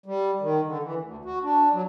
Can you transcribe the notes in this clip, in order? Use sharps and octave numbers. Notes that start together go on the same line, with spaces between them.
G3
D#3
D3
E3
D2
F#4
D4
F#3